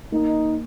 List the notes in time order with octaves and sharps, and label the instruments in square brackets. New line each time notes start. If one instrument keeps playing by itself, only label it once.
[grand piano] A#3 [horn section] D#4